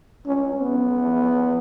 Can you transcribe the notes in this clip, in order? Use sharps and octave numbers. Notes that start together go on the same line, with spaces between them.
C#4
B3